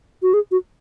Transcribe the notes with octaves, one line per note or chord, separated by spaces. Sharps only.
F#4
G#4
F#4